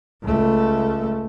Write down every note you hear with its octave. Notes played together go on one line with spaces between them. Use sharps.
C#2 A3